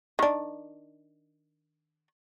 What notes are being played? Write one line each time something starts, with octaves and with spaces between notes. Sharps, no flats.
D#3 D4